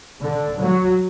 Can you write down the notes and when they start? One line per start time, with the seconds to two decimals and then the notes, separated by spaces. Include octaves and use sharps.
0.20 D3
0.59 F#3